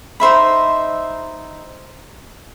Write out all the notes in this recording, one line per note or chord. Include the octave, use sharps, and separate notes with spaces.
D#4 C5 E5 B5